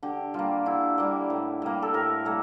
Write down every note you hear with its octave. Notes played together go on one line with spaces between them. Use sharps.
D3 G4
G3 A#3 F4
D3 E4
G3 A#3 D5
A2
G3 A#3
A4
A2 A#4
G3 A#3 A4